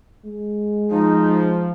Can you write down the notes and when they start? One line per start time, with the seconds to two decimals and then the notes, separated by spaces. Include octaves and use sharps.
0.25 G#3
0.90 F3 D#4